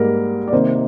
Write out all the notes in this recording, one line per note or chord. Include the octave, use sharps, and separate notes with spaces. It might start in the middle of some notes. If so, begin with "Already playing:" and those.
Already playing: G#2 G3 A#3 A#4
D5
C3 D#3 A#3 C5